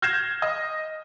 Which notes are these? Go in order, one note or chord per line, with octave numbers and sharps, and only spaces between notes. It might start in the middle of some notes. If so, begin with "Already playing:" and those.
F6 G6 G#6 A#6 C7 E7
D#5